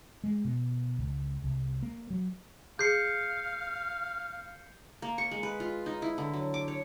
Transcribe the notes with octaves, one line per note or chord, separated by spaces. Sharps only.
G#3
B2
C#2
C2
A#3
F#3
G#4 F5 G6 C7 C#7
A#3
C#6
G#3
B4
F4
D#4
E4
D3
F#3
D6
C#5